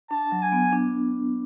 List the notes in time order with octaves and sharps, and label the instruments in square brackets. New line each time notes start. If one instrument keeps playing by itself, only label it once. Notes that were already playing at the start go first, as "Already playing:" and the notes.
[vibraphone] D4 [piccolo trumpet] A5
[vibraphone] F#3
[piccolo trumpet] G#5
[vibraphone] B3
D4